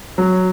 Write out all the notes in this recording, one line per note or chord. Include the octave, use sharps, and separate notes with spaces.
F#3